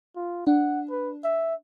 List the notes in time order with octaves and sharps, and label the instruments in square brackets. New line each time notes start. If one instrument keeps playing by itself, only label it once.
[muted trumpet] F4
[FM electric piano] D4 [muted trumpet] F#5
[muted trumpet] B4
E5